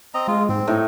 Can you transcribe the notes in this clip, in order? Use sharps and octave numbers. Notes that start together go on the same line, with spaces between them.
C4 D#5 A#5
G#3 F4
G#2 C4
A2 D#4